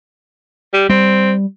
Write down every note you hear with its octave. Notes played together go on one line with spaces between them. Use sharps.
G3
G3 C4